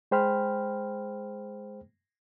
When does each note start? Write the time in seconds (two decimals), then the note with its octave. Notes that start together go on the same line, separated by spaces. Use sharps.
0.11 G#3 G#4 C5 G5 B5 F6